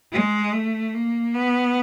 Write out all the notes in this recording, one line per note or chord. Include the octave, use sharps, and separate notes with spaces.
G#3
A3
A#3
B3